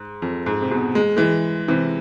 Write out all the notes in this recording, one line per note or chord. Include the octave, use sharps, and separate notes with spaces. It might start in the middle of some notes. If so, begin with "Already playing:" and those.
Already playing: G#2
F2
G#2
C3
G#2 B2
G#3
E3 G#3
C3 E3